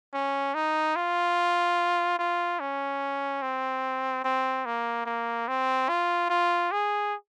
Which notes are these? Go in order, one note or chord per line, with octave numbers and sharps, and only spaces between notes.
C#4
D#4
F4
F4
C#4
C4
C4
A#3
A#3
C4
F4
F4
G#4